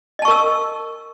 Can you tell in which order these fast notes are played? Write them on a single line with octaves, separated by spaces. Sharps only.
D#5 A5 C#6 A#4 E6